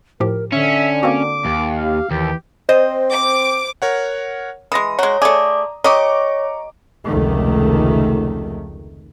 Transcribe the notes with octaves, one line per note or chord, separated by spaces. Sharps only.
A2 F3 G4 A#4
D3 C#4 E5
A#3 C4 F#4 D6
D#2
G4 F5
D#2 E3 G4
C4 C5 D#5
D6
A#4 C#5 F#5
E3 G#3 D#6 A#6
G#3 F#4 C#5 A#5
A3 G#4 D5 D6
G4 C#5 D#5 A#5 C#6 D6
F1 C#2 D#3 A3